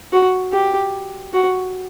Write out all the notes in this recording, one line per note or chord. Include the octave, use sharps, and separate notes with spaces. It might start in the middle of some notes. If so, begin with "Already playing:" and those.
F#4
G4
F#4